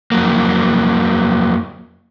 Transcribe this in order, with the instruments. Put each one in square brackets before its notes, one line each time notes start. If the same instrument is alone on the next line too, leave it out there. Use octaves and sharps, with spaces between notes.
[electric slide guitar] F2 F#3 A#3